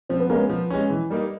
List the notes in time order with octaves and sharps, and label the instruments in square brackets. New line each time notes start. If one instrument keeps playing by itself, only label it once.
[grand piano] F3 [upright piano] C4
[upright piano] B3
[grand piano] G#3 C#4 [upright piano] A#3
[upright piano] B3
[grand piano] F3
G#3 C#4
E3
G3 A#3 D#4